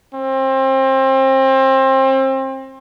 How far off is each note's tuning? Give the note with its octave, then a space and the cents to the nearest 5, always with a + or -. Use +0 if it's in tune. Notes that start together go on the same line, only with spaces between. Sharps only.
C4 +30